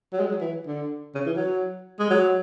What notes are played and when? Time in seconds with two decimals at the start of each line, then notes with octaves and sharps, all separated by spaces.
0.13 F#3
0.19 G#3
0.30 F#3
0.40 E3
0.67 D3
1.14 C#3
1.26 E3
1.36 F#3
1.99 G#3
2.10 F#3